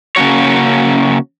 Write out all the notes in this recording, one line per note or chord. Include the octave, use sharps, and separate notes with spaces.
C#3 A#3 C#4 F#4 C#5